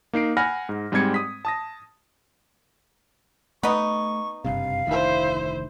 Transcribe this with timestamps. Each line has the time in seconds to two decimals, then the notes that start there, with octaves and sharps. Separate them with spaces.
0.13 A#3 D#4 C7 D7
0.37 F#5 G#5 B5 F6 A#6
0.69 G#2
0.92 G#2 G3 G#3 C4 G#6 C#7
1.14 D#6 B6
1.45 A5 D#6 A#6
3.63 A3 B3 D#4 C#6
4.45 F#1 G2 C3 F5
4.87 F1 D2 D#3 E4 C5